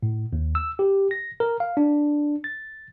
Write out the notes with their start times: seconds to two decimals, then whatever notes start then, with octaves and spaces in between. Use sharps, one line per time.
0.03 A2
0.33 D#2
0.55 E6
0.79 G4
1.11 A#6
1.40 A#4
1.60 F5
1.77 D4
2.44 A6